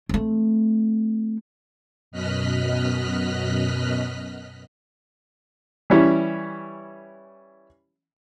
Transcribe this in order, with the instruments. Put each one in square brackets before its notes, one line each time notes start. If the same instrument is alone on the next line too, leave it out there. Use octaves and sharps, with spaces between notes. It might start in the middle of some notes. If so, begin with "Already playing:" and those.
[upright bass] A3 C4
[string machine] F#2 B2 D#5 F6 F#6 B6
[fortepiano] E3 G3 C#4 E4